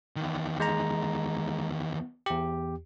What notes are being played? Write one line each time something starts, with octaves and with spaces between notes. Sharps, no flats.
E2 D#3
G#3 A#5
E2 G4